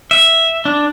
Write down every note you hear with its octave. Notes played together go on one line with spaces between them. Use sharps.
E5
D4